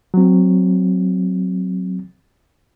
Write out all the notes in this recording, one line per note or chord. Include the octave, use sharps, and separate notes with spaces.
F#3 C4